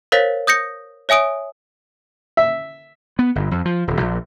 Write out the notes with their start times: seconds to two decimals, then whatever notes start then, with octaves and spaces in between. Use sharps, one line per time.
0.12 A#4 C5 C#5 F5 A6 B6
0.47 D#6 G6 A#6 C#7
1.09 C#5 E5 G#5 D#6 D7
2.37 E5
3.19 B3
3.35 G1
3.51 F2
3.65 F3
3.87 D#1
4.00 A#1